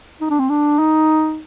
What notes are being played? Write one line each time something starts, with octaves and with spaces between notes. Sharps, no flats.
D#4
D4
C4
D4
D#4